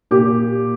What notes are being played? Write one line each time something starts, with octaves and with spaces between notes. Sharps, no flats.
A#2 G4